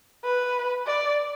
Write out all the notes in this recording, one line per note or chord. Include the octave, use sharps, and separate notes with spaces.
B4
D5